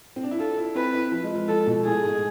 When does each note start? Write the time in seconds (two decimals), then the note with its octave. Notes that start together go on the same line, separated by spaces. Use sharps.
0.16 C4
0.24 D4
0.31 E4
0.39 F4 A4
0.57 E4
0.75 C4 B4
0.94 E4
1.12 F3
1.24 G#3
1.35 F3
1.48 F3 A4
1.67 B2
1.85 A2 G#4
2.03 G#2